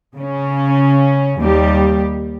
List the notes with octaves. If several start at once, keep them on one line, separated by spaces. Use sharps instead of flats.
C#3 C#4
D#2 G3 G4